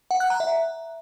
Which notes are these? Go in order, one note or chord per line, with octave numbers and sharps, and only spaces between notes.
F#5
F#6
A#5
E5